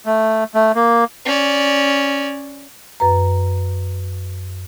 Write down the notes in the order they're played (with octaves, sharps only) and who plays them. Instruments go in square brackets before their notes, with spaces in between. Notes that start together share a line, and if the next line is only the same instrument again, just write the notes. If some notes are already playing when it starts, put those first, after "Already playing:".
[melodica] A3
A3
A#3
[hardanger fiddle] C#4 D5
[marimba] F#2 B4 A#5